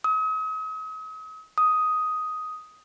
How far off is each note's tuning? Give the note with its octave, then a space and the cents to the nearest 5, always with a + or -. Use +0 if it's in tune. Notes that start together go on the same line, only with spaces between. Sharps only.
D#6 +40
D#6 +5